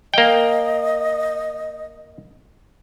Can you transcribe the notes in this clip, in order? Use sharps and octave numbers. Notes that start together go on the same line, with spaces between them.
A#3 D#5 G5